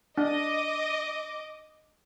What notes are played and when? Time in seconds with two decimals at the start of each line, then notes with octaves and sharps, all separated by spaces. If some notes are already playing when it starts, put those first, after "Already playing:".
0.18 D4 D#5 D6